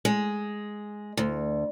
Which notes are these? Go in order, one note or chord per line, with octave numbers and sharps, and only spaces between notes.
G#3
D2